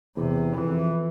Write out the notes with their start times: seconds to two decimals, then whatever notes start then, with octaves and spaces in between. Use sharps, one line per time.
0.17 E2 C3
0.55 F2 E3